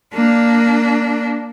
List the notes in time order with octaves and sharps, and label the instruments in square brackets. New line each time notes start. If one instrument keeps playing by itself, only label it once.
[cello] A#3 D4